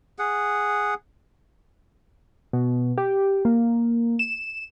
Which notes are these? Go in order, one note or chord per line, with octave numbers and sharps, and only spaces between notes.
G#4 F#5
B2
G4
A#3
E7